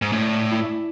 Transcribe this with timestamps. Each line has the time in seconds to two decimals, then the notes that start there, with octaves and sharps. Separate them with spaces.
0.02 G#2
0.12 A2 D4
0.51 E4